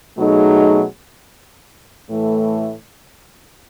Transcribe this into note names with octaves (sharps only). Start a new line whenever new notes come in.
B2 F#3 A3 D#4 G#4
A2 E3 A3